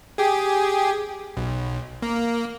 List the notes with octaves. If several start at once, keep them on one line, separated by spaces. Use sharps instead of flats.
G4 G#4
B1
A#3